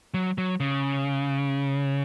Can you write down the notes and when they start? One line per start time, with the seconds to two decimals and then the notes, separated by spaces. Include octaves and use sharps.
0.14 F#3
0.38 F#3
0.60 C#3